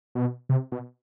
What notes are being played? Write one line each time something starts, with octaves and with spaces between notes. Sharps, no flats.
B2
C3
B2